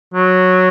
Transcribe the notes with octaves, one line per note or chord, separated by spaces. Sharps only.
F#3